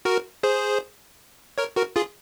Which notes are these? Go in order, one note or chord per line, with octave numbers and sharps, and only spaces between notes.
F#4 A#4
G#4 C5
A#4 C#5
F#4 A#4
F4 G#4